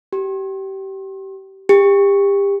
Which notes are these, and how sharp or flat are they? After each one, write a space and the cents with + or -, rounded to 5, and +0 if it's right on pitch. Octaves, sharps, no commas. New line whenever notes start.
G4 -25
G4 +30